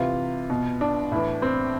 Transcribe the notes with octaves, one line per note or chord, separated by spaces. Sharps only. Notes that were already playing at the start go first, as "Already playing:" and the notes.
Already playing: C3 E3 F4
B2
D4
A2 E3
C4